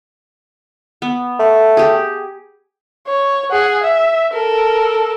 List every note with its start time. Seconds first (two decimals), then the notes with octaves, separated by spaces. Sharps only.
1.02 B3
1.39 A3
1.77 G4 G#4
3.07 C#5
3.51 G#4 F#5
3.83 E5
4.33 A4 A#4